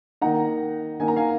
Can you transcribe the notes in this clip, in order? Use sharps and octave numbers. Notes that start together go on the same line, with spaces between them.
D#3 A#3 D#4 F#5 A#5
D#3 A#3 D#4 G#5
A#5
F5 G#5